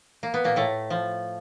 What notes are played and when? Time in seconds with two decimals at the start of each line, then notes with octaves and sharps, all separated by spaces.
0.23 A#3
0.34 B3
0.44 A#2 A#3
0.56 A2 A3
0.90 F3